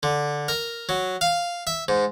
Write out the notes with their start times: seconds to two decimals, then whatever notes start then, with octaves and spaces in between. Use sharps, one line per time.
0.03 D3
0.48 A#4
0.89 F#3
1.21 F5
1.67 E5
1.88 G#2